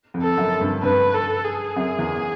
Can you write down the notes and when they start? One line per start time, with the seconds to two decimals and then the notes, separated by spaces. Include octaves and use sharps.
0.14 F2
0.22 A4
0.37 F#2
0.61 G2
0.83 G2 B4
1.14 A4
1.45 G#4
1.76 F#2
1.99 E2